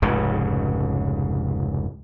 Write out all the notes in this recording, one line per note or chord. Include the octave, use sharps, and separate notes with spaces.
F1 C#2 G#2 C#3